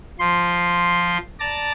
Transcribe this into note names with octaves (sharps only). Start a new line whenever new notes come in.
F3 C6
D5 A5 A#5